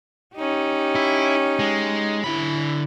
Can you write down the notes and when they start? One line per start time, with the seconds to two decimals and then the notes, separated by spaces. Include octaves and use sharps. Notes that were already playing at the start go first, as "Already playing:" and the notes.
0.36 C#4 D#4 G4
0.95 E4
1.59 G#3
2.24 D3 E4 B5